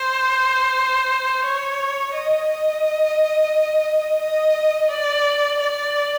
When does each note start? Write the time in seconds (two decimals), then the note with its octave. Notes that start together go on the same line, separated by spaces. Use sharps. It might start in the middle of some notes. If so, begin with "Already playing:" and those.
Already playing: C5
1.44 C#5
2.13 D#5
2.48 D#5
4.21 D#5
4.90 D5
5.59 D5